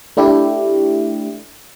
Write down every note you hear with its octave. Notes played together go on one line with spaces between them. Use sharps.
A3 D4 E4 G4